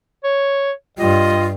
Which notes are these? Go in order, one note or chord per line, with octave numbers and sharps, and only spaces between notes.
C#5
G2 G3 F4 D#5